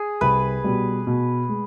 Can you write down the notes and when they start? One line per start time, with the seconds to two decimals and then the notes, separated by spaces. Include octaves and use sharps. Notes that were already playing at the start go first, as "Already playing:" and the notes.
Already playing: G#4
0.21 C2 B4
0.64 B2 G3
1.07 B2
1.49 G#3